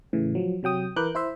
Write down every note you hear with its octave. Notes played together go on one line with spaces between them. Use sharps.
A2 C#3 E3
F3 F#3
C3 F#3 G5 D#6
E3 A#4 B4 D6 F#6 G6
E4 C5 E5